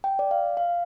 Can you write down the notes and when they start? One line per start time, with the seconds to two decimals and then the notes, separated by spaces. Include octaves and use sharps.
0.04 G5
0.19 D5
0.31 F5
0.57 F5